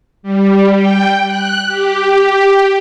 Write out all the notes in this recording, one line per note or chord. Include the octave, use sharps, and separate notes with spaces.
G3
G5
F#6
G4